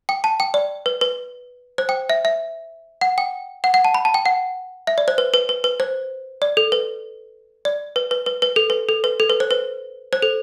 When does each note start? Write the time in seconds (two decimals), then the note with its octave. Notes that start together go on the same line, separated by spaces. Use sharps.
0.09 G5
0.24 A5
0.40 G5
0.54 D5
0.86 B4
1.01 B4
1.78 C5
1.89 G5
2.10 E5
2.25 E5
3.01 F#5
3.18 G5
3.64 F#5
3.74 F#5
3.85 A5
3.94 B5
4.05 A5
4.14 G5
4.26 F#5
4.87 E5
4.98 D5
5.08 C5
5.18 B4
5.34 B4
5.49 B4
5.64 B4
5.80 C5
6.42 D5
6.57 A4
6.72 B4
7.65 D5
7.96 B4
8.11 B4
8.26 B4
8.42 B4
8.56 A4
8.70 B4
8.89 A4
9.04 B4
9.20 A4
9.30 B4
9.40 C5
9.51 B4
10.13 C5
10.22 A4